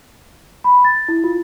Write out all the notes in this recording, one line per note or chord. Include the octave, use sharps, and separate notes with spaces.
B5
A6
E4
F4